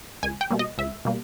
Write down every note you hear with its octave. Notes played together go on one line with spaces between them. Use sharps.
C#2 G#5
G5
B2 G3 A#3
D#5
C#2 E5
B2 G3 A#3